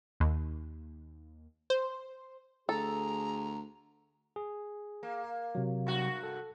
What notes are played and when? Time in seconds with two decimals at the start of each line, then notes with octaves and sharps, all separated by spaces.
0.20 D#2
1.70 C5
2.69 D2 G#4 A4 A#5
4.36 G#4
5.03 A#3
5.55 C3 F#3
5.87 G2 F#4
6.23 A4